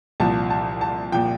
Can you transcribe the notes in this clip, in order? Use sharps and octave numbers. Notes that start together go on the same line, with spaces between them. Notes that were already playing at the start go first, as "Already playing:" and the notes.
C2 A#2 F3 A5
A5
A5
A#2 F3 G5